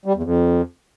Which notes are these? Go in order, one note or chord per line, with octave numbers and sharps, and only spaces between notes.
G3
E2
F2